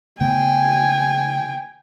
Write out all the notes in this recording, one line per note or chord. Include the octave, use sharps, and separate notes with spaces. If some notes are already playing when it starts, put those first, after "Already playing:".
C#3 A3 B3 G5 G#5